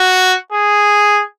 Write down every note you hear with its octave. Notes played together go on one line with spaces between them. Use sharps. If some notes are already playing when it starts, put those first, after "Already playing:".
Already playing: F#4
G#4